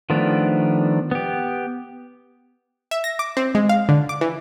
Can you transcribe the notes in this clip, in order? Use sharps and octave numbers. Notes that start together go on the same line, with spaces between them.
D#3 F3 A3 B3 D4
B3 G4
E5
A#6
D6
C4
G#3
F5
D3
D6
E3